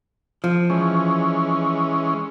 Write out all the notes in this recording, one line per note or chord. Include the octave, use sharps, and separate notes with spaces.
F3
E3 G#3 C#4